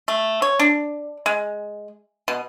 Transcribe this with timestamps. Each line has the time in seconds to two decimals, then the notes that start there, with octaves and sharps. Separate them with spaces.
0.08 A3
0.42 C#5
0.60 D4
1.26 G#3
2.28 B2